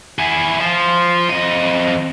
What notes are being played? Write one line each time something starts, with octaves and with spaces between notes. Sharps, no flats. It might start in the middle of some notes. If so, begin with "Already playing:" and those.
E4 G#4
F3 F4
F2 D#5